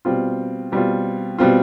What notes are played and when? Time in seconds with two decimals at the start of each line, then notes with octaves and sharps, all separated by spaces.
0.05 B2 G3 C4 F4
0.72 B2 G3 C4 F4
1.38 B2 G3 C4 F4